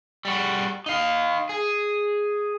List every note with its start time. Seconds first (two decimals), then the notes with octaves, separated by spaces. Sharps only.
0.25 G3 F#4
0.86 D#4 F5
1.49 G#4